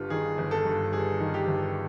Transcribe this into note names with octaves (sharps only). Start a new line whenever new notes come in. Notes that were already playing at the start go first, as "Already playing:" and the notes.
Already playing: G1 G2 G3 F4
D#3 G#4
G1
A4
G2
G3 G#4
D#3
G4
G1